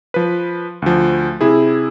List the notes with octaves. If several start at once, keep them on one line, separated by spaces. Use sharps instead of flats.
F3 B4
D2 F3
C3 E4 G#4